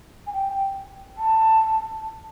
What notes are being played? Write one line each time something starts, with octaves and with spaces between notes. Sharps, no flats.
G#5
G5
A5